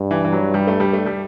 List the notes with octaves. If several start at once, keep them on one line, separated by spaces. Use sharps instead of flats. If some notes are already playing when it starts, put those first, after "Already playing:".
Already playing: G2
E3
E3
F#3
G3
A3
G3
A3
G3